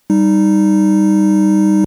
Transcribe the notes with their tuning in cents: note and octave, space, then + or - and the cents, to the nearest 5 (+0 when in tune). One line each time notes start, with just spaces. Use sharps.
G3 +0 D#4 -5